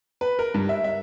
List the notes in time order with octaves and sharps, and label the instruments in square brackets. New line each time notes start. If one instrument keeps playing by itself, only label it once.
[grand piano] B4
A#4
G2
E5
E5